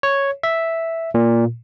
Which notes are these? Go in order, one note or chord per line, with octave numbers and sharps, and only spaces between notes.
C#5
E5
A#2